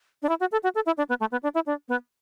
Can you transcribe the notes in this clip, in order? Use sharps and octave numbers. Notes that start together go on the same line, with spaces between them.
D4
E4
F#4
A4
F#4
A4
E4
D4
B3
A3
B3
D4
E4
D4
B3